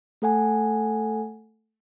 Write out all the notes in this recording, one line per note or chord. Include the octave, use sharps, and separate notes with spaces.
A3 A4 F#5 G#5